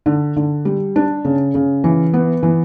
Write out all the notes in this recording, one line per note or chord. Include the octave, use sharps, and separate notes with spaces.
D3
D3
G3
D4
C#3
C#3
E3
B3
E3